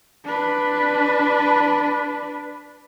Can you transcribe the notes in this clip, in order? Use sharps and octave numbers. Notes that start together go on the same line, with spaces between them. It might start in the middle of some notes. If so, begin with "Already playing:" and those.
D4 B4